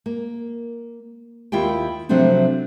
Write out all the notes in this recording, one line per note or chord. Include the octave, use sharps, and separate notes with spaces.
A#3
D#2 E4 F4 G4 G5
C3 F3 F#3 A3 C4 D4